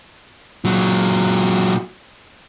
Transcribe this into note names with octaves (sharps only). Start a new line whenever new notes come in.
A#2 F#3